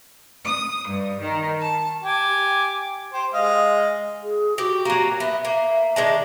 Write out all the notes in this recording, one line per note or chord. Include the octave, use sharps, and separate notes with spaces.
D#6
G2
D#3
A5
G4 G#5 D6
G4 C5
G#3 D#5 F5
G#4
F#4 G4
F#3 A#3
B3 E5
A#3 E5
D#3 G#3 D4